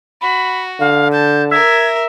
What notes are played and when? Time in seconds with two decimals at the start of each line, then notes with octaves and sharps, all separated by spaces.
0.21 F#4 B5
0.80 D3 F5
1.12 A5 G6
1.51 A#4 E5 G#6